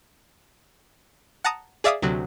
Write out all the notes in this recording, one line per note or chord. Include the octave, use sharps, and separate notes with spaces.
F#5 A5 A#5 D#6
G#4 D5 E5 F5 D6 D#6
D2 C3 F#3